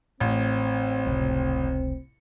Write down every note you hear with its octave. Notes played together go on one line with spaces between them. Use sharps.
A1 C4
F1 C#2